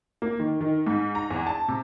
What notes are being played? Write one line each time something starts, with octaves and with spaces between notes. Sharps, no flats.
A#3
D#3
D#3
G#2
A#5
E2
A5
C3